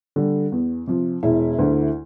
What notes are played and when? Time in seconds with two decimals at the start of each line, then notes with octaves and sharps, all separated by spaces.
0.16 D3 G3
0.52 E2
0.87 C3 F3
1.23 E1 E4
1.59 D2 D3